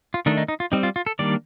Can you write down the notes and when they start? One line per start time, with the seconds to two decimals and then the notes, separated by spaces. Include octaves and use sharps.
0.14 F4
0.26 D#3 A3 D4 D#4
0.37 D#4
0.48 D#4
0.60 F4
0.72 G3 C4 D#4
0.83 F4
0.96 F4
1.06 A4
1.19 D#3 G3 A#3 D4 D5